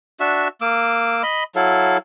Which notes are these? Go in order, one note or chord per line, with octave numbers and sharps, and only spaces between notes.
D4 F#4 E5
A#3 D6 E6
D#5 B5
F#3 E4 A4 F5